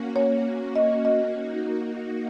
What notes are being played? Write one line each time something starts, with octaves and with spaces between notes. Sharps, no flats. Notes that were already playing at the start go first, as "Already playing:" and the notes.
Already playing: A#3 C#4 F#4
C#5
D#5
D#5
A#3 D#4 F#4